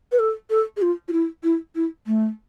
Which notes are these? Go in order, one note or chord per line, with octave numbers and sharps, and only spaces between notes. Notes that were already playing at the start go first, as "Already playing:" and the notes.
B4
A4
A4
G#4
F4
F4
E4
E4
E4
A3